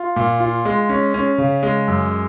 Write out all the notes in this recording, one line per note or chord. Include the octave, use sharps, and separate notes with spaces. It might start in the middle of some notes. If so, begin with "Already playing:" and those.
Already playing: F4
A#2
F4
G#3
C#4
C#4
C#3
G#3
F#2